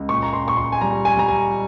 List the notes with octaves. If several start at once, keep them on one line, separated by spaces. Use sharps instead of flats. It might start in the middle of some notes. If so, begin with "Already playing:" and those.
Already playing: C#2
A#2 C#6
A#5
C6
A#2 C#6
C6
G#5
G3 A#5
G#5
G3 A#5
G#5